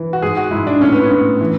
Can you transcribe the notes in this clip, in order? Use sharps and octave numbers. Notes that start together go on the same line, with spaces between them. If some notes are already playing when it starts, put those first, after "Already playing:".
Already playing: E3
F#4
G#2 G#4
F#4
G#2 E4
D4
A2 C#4
B3
C#4
A2
E3